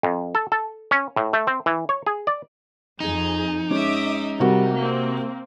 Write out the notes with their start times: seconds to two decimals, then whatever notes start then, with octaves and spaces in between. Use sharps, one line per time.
0.03 F2
0.35 A4
0.52 A4
0.91 C#4
1.16 A2
1.33 A3
1.47 C4
1.66 E3
1.89 C#5
2.06 G#4
2.27 D5
3.00 F2 D#4 G#4
3.70 G#3 C#4 E5 D6 D#6
4.40 C3 G3 F#4 A#4
4.78 A#3 C4